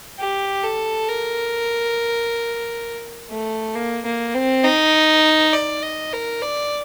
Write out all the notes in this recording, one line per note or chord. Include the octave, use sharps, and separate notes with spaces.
G4
A4
A#4
A3
A#3
A#3
C4
D#4
D5
D#5
A#4
D5